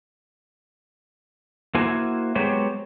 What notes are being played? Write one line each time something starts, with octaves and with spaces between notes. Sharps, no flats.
A#3 E4 F#4 C5 G#5
F#3 G#3 B3 G4 C5 C#5